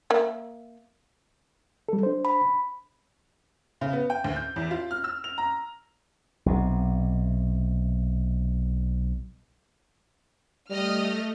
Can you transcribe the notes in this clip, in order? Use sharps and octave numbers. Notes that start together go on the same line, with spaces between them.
A#3 E5
G3 A4
D4 C5
B5
C#3
B3
G5
D2
G6
E2
F4
F6
E6
F7
A#5
B1 C3
G3 A3 D#5 F6